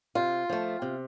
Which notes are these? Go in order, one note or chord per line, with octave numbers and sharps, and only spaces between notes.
C3 F4
F3 A3
C3